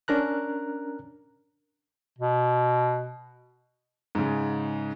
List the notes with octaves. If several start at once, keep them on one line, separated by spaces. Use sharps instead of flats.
C#4 D4 A#4 A#5 F#6
B2
G#2 C#3